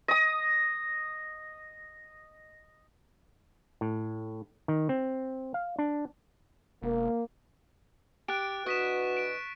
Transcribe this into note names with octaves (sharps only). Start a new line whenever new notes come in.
D#5 D#6
A2
D#3
C4
F5
D4
E1 A#3
G4 F#6 A6 D7
E3 D4 F#4 B4 D#5 C#6 B6 E7
D7 E7